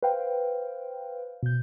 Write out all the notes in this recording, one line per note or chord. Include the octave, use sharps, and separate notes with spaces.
B4 C5 F5 G5
B2 G6